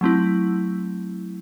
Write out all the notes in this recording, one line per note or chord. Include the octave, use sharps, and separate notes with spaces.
F#3 A3 C4 E4